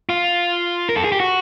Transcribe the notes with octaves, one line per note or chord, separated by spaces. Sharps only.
F4
A#4
A4
G#4
G4
F#4